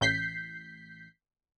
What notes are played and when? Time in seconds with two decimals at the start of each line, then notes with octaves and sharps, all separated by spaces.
0.01 A1 G6 B6 C7